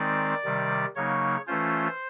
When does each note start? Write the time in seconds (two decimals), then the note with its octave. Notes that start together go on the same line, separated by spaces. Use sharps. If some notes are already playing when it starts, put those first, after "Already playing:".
Already playing: D#3 G#3 C4 D#4 D5
0.44 C3 D#3 G3
0.96 C#3 F#3 A#3 D#4 C#5
1.47 E3 A3 C#4 F4 C5